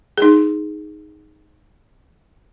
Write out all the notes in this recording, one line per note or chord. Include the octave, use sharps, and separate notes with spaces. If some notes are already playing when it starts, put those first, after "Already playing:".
D#4 G#4